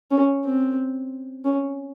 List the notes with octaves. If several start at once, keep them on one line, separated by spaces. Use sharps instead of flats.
C#4
C4
C#4